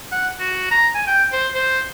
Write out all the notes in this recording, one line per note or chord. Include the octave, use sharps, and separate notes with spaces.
F#5
F#4
A#5
G#5
G5
C5
C5